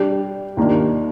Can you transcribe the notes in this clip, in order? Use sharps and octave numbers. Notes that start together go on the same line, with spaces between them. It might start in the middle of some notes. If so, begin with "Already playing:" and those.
Already playing: G3 D4 G4
D#2 D#3 A#3 D4 F4